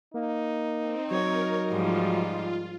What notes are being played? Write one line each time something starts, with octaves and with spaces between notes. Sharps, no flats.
A#3 D#4
C4
F#3 A#4 C#5
G#2 F3 G3 F4